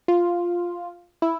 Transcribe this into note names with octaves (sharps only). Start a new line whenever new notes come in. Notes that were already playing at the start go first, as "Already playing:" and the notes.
F4
E4